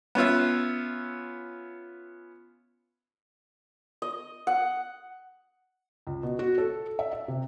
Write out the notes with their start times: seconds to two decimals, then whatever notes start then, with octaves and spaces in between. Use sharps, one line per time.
0.15 B3 C#4 F4 E5
4.02 D#5
4.47 F#5
6.07 C#2
6.23 B2
6.39 F#4
6.58 A4
6.99 E5
7.13 E5
7.28 C3